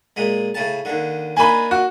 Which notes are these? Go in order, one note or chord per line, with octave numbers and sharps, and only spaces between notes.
A#2 G#3
A2 C#3 A5
D#2 D3
A#3 D4 D#4 G#5 B5
F#4